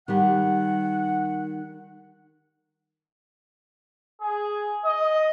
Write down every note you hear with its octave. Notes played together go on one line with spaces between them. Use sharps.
D#3 G3 G4 F#5
G#4
D#5